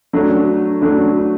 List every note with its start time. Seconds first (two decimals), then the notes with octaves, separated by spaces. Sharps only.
0.13 F#3 A3 D4
0.81 F#3 A3 D4